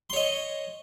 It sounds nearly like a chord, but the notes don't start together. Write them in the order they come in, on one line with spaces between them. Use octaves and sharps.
C6 C#5 D#5